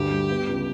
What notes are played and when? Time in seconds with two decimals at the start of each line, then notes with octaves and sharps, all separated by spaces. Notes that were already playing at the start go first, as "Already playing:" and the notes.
Already playing: D2 G2 G4
0.11 G3
0.30 B3
0.47 C#2